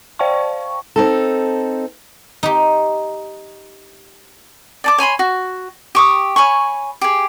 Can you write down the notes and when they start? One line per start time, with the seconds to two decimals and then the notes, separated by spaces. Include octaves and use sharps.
0.19 C5 D5 F5 G5 A5 C#6
0.96 C4 D#4 A4
2.43 D#4 G4
4.84 D5 A5 D6
4.98 C#5 G#5 B5 C6
5.19 F#4
5.95 G4 C#6 D#6
6.36 C#5 G#5 B5 C#6
7.01 G4 G#4